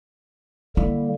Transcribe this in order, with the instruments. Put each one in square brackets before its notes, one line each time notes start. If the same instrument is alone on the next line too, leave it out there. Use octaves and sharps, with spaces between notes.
[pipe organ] D3 G3 A#3 [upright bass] E4